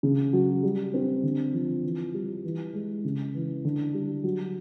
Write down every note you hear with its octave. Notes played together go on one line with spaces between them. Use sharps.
C#3
F#3
G3
C4
D3
F3
E3
G3
E3
G#3
C#3
E3
D3
G3
F#3